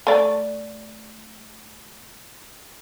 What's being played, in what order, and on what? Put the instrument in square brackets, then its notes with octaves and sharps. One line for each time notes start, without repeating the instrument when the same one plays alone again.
[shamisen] A3 D5